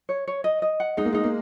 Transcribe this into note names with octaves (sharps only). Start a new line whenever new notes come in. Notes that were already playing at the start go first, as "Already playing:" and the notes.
C#5
C#5
D#5
D#5
F#5
G#3 D#4
A#3
G#3 D#4
A#3